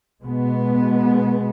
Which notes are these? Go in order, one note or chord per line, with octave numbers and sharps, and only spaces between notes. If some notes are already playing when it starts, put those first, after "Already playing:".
B2 G#3 B3